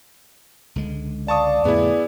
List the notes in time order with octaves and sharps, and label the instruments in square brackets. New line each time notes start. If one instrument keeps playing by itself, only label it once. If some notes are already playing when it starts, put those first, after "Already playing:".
[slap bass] C#2 D3 G#3
[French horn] D5 [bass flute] F5 [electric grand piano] A5 C#6 D#6
[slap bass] F2 A2 D3 [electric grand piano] B3 E4 [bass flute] G#4